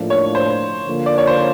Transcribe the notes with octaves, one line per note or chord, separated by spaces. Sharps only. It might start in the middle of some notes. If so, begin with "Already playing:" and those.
Already playing: A2 F3 A#3 D4
C#5
C5
D3 F3 A#3
D5
C#5
C5